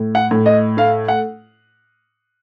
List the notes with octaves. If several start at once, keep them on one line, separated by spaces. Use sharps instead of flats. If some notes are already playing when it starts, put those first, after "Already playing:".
Already playing: A2
F#5
A2
D#5
A3 F5
F#5